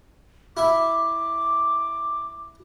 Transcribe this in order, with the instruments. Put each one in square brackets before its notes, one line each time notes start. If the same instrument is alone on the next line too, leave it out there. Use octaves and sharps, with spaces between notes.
[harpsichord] E4 E5 [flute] D6